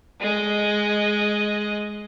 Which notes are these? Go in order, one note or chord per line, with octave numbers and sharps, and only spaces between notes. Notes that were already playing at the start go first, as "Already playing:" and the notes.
G#3 D#5